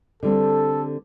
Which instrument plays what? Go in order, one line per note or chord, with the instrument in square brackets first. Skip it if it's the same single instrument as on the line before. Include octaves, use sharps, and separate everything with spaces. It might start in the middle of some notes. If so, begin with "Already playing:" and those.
[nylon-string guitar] D3 G3 C4 [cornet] A4